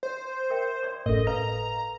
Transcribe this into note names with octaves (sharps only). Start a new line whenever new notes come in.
C5
A#4 E5 G5
D5 C6
G1 A2 A4 A#4 D#5
B4 F5 A#5